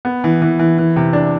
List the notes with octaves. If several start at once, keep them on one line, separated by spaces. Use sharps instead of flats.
B3
E3
E3
E3
E3
C3
D4